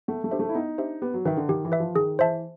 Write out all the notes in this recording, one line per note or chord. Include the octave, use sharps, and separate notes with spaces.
A3 B3
A3
D4 G4 C5 E5
A3
E4
B3 D#4
D4 G4 C5 E5
B3 G4
F#3
D#3 B4 E5
D3
D#3 G4
E3
B4 E5
F3
D#3 G#4
E3 C5 E5 A5